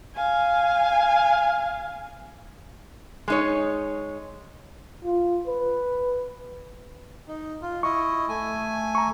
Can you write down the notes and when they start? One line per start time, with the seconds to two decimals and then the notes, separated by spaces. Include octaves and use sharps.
0.15 F5 G#5
3.28 G#3 D#4 C#5
5.04 F4
5.47 B4
7.28 D#4
7.62 F4
7.83 E4 D#5 C#6
8.29 A3 G#5
8.95 A#5 C#6